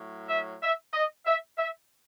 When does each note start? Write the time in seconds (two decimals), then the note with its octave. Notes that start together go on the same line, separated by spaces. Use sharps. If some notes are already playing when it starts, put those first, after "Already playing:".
Already playing: A2 F#3
0.29 E5
0.61 E5
0.94 D#5
1.26 E5
1.58 E5